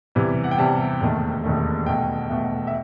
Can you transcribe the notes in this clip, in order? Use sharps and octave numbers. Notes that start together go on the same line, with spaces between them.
E2 C3 E3 G3
F#5
G5
E2 C3 E3 G3 A5
E1 D#2 D#3 A3
E1 D#2 D#3 A3
B1 B2 A3 G5
B1 B2 A3 E5
E5